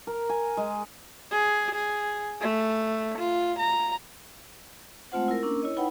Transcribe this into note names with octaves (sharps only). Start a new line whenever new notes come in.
A#4
G#5
G#3
G#4
G#4
A3
F4
A#5
G#3 A3 C4 F4 C5 F#5
E4 A#4
A#3 C#4 D4 A#4 E6
E4 C#5 D#5
D#4 E4 B4 F#5 G5 B5